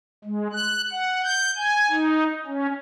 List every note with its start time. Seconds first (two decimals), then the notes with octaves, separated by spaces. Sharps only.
0.24 G#3
0.53 F#6
0.92 F#5
1.24 G6
1.57 G#5
1.90 D#4
2.46 C#4